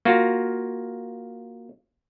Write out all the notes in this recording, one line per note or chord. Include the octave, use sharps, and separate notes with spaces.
A#3 F4 F#4